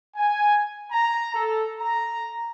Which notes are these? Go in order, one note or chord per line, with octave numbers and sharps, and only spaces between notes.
G#5
A#5
A4
A#5